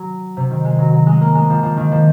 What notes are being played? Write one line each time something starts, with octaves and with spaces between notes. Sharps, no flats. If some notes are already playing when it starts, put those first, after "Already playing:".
Already playing: F#3
C3
D#3
G#3
F#3
F#3
G#3
A#3
G#3
F3
F3
D#3
F3